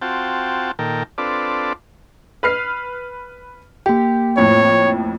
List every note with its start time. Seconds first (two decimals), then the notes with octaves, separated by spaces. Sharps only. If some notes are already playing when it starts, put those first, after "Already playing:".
0.02 C4 F4 F#4 G5 A5
0.79 A#2 D#3 A4 A#4 G5
1.18 C4 D4 F4 A4 B4 D5
2.43 B4 F6 C7
3.86 A#3 G4 G5
4.37 F2 A2 C#5